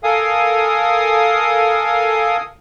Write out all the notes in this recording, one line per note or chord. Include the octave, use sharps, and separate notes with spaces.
A4 A#4 F5 G#5 D#6